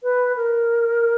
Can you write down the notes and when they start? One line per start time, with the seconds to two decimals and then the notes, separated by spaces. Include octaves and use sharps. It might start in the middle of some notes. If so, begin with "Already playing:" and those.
0.03 B4
0.36 A#4